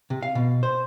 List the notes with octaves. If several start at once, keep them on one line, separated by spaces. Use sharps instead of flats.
C3
F5
B2
C5